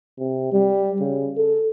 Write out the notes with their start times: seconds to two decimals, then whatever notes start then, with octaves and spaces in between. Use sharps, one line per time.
0.19 C3
0.53 G3
1.00 C#3
1.37 A4